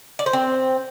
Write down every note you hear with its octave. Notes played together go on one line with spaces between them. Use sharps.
D5
C5
C4